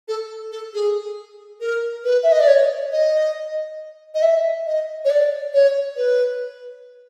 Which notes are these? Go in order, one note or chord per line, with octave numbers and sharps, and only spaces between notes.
A4
A4
G#4
A#4
B4
E5
D#5
D5
C#5
D#5
D#5
E5
D#5
C#5
D5
C#5
B4